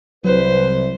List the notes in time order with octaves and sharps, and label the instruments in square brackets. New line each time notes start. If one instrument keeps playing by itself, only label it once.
[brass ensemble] C2 [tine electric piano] F#3 [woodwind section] B4 [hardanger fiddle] C5